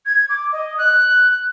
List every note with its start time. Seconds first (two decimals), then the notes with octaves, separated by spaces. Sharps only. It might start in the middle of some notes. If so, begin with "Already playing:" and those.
0.05 G#6
0.29 D6
0.52 D#5
0.78 F#6